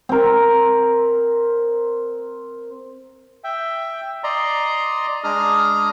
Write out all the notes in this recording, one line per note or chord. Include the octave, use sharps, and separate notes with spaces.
C4 A#4
E5 G5
D5 D#5 A#5 C6
G#3 D4 G#4 A#5 D#6 F6